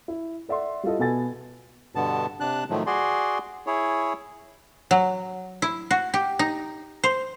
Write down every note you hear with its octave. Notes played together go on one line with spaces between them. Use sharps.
E4
A4 D5 E5 F#5 C6
G3 E4 F4 A4 D#5
B2 B3 A4 G#5 A6
G2 B2 D3 B3 A5
C3 D4 A5 F#6
A2 D#3 F3 F#3 A3
F#4 G#4 D5 C6
E4 G#4 C#5
F#3
E4
F#4
G4
D#4
C5